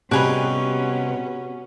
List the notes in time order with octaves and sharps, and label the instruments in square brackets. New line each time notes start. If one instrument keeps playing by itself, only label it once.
[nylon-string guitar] C3 [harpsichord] G3 D#4 [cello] B3 C#4 [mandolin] F#4 G#4 B4